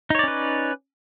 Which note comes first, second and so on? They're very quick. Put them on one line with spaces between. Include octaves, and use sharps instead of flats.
D#4 C#5 D5 C#4 B4